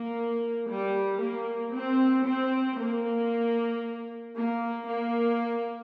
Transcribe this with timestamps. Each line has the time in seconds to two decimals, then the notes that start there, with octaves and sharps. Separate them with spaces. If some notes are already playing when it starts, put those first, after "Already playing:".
Already playing: A#3
0.68 G3
1.21 A#3
1.73 C4
2.26 C4
2.78 A#3
4.36 A#3
4.89 A#3